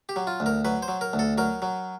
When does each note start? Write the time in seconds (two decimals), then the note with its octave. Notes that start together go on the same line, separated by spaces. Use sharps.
0.09 G4
0.16 F#3
0.27 F4
0.40 D2
0.46 A#4
0.65 F#3 B4
0.82 C5
0.88 F#3
1.01 A#4
1.13 D2
1.19 A4
1.38 F#3 A#4
1.62 F#3